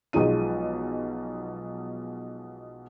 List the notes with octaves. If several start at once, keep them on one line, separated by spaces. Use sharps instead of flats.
B1 B2 F3 G#3 D#4 D#7